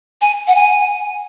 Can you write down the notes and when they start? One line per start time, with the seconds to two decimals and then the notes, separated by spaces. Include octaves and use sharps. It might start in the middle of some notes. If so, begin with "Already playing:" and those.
0.22 G#5
0.48 F#5
0.55 G#5